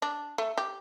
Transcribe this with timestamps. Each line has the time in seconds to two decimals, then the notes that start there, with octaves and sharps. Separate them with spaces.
0.02 D4
0.38 A3
0.58 G4